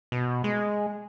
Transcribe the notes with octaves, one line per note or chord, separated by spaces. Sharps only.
B2
G#3